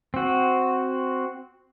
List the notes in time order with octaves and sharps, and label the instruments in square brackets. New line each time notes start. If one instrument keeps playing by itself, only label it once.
[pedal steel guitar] C4 F#4